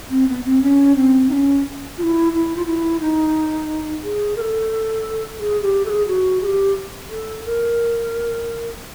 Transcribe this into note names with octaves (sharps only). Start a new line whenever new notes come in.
C4
B3
C4
C#4
C4
D#4
C#4
F4
E4
E4
F4
E4
D#4
G#4
A#4
A4
G#4
G4
A4
G#4
F#4
G#4
G4
A4
A#4